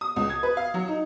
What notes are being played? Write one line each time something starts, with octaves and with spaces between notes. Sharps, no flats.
D#6
C#2
G#6
B4
F5
F#3
D#4